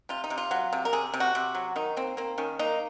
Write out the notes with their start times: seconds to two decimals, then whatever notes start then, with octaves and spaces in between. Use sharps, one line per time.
0.09 C3 F4
0.24 D#4
0.30 C3
0.38 F4
0.51 F#3
0.73 C3
0.85 A#4
0.93 C3 G#4
1.14 C3
1.20 F#4
1.35 C3
1.55 F#3
1.76 D#3 D#4
1.96 A#3 C4
2.17 A#3 C4
2.38 D#3 C#4
2.59 A#3 D#4